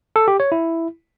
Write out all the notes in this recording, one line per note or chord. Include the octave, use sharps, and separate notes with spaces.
A4
G4
C#5
E4